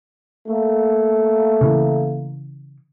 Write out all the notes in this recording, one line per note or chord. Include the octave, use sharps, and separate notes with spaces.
A3 A#3
C#3 E3